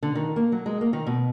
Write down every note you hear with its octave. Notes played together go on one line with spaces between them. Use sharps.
D3
D#3
A#3
F#3
G#3
A#3
D#3
B2